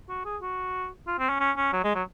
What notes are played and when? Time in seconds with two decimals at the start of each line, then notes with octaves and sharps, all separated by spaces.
0.09 F#4
0.25 G#4
0.42 F#4
1.07 F4
1.19 C4
1.29 C#4
1.40 C#4
1.57 C#4
1.73 F#3
1.84 G#3
1.95 F#3